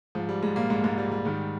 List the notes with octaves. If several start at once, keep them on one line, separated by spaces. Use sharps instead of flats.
G#2 F3
G3
G#2 G#3
A#2 A#3
G#2 G#3
G#2 G#3
G3
G3
G#2 D#3